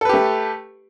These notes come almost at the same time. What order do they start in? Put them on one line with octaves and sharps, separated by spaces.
A4 B4 G4 A3